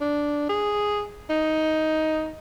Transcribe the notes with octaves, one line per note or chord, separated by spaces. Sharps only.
D4
G#4
D#4